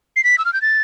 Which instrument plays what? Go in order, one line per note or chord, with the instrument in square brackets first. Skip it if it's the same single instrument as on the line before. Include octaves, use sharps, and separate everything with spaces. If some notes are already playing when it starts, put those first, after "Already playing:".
[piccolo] C7
B6
E6
F6
G6
A6